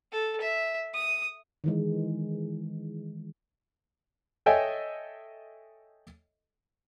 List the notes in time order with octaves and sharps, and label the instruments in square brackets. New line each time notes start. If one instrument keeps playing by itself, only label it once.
[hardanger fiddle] A4
E5
D#6
[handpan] D#3 E3 G#3
[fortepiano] A4 C#5 D#5 E5 G5 G#5